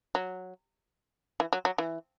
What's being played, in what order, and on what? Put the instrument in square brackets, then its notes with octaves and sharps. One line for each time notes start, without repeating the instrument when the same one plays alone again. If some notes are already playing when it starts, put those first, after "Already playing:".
[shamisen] F#3
E3
F#3
F#3
E3